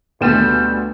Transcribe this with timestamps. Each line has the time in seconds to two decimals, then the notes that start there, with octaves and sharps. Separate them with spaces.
0.21 D2 B2 G3 B3 E7